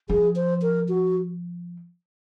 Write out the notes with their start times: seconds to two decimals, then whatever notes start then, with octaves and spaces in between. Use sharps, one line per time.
0.09 F3 G#4
0.36 C5
0.62 A#4
0.89 F#4